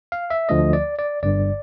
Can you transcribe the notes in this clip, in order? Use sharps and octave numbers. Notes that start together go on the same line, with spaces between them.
F5
E5
D2 D3 F3 A3 D#5
D5
D5
G1 G2 D3 D5